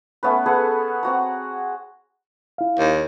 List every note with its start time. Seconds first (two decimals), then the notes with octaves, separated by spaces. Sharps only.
0.23 A3 B3 C#4 B4
0.46 G#4 A4 B4 F#5
1.03 C4 F#4 A#5
2.58 E4 F5
2.79 D#2